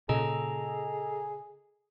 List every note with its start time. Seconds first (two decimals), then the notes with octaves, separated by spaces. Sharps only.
0.09 A#2 C#3 G#4 A4 D#5 A#5